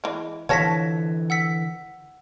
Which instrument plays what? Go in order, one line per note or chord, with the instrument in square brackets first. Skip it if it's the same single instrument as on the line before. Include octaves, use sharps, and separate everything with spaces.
[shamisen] E3 G#3
[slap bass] D3 E3 [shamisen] F3 C#5 A5 [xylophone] G#6 A#6 B6
[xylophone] F#5 E6 B6